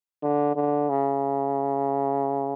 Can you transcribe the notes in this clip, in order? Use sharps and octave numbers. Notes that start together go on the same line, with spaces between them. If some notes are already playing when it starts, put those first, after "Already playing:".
D3
D3
C#3